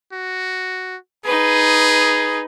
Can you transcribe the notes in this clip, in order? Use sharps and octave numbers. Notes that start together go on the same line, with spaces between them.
F#4
D#4 G#4 B4